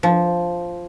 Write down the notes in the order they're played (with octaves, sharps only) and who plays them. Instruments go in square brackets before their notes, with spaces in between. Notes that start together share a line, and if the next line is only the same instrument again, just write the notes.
[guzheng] F3